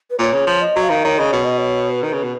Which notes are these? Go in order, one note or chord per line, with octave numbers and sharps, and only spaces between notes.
B4
A#2 C#5
C#3
F3
D#5
F#3
F5
D#3
D#3 C#5
C#3 D#5
B2 C#5
D#5
C#5
B4
D#3
C#3
B2